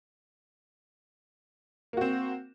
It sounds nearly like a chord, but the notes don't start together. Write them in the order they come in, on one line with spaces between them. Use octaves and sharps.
A#3 F#4 C4